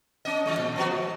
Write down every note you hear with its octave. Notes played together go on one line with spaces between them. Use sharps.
C#4 D#5
E3 G#3
A#2
F3 B3 F#4
G#3